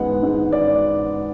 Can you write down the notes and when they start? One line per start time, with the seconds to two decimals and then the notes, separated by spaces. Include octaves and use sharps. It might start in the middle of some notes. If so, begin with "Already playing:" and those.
Already playing: G#2 G#3 B3 F#5
0.23 G#2
0.52 D5